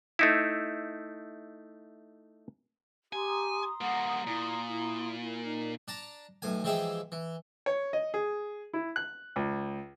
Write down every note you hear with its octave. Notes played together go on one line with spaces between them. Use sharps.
A3 D#4 E4
G4 G#5 A#5 C6 D#6
G3 A#3 F#5
A#2 E4
E4
E4 A#4
D#4
D4 A5 A#5
B1 A2 G#5
E3 F3 G#3 G4 G#4 E5
E3
C#5
D#5
G#4
E4
F#6
C#2